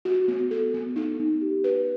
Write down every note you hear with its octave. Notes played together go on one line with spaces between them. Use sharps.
F#4
B3
A4
B3
D#4
B3
G4
B4